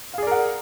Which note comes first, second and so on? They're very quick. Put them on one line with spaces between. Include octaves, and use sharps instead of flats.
F5 G#4 D5 A#4 F#5